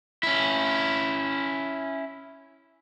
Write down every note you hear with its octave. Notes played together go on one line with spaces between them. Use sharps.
C#4 E4